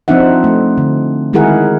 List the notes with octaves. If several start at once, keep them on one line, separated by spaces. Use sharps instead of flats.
F3 C4 D4 D#4 E5 F#5
A3
D3
D#3 G#3 E4 G#4 A#4 F#5